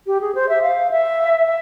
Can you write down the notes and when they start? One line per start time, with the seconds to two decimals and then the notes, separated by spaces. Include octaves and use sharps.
0.07 G4
0.21 G#4
0.35 C5
0.49 E5
0.62 F5
0.91 E5
1.47 E5